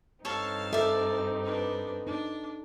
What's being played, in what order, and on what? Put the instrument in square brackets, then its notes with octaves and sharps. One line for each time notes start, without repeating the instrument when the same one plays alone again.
[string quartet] G2 C4 D#4 [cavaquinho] A4 C#5 [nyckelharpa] F5 A5
[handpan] A4 A#4 [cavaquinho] D5 E5
[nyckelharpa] D4 B4
[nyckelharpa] D4 [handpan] D#4